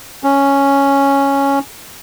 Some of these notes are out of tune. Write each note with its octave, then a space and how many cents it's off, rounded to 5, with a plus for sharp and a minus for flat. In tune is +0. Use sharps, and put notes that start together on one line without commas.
C#4 +0